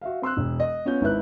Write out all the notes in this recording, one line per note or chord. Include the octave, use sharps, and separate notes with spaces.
F#4 E5 F5
C4 C6 E6 F#6
E1
D#5
B3 C#4 F4 G6
G#1 G#2 E4 B4 F#6